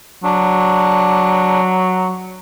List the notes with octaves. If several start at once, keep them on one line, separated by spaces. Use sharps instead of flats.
F#3 D4